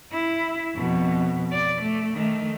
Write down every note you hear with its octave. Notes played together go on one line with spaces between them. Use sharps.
E4
F2 B2
D5
A3
D#3 A3